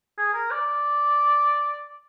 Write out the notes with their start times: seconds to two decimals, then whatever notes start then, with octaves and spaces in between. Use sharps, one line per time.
0.18 G#4
0.34 A#4
0.51 D5